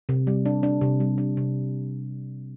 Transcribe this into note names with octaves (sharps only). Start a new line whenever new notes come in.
C3
G3
D4
D4
C3
G3
D4
C3